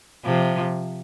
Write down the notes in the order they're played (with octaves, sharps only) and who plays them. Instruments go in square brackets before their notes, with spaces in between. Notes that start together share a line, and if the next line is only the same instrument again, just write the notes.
[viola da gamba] C3 F3